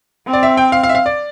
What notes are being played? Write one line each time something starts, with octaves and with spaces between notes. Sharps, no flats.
C4
D5
E5
G5
F5
F5
E5
F5
D5